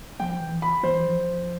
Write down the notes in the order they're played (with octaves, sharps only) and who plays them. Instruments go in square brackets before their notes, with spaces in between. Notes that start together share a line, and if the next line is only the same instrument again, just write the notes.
[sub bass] F3 [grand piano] G5
[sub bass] E3
[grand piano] B5
[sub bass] E3 [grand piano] C5
[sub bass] F3